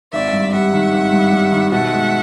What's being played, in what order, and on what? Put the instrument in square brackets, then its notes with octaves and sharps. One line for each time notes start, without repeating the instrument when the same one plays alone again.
[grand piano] G#1 [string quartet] D5 E5
[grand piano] G2
[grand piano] G3 [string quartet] E5 F#5
[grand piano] D#3
G#1
G2
G3
D#3
[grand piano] B2 [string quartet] E5 F#5
[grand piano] G#3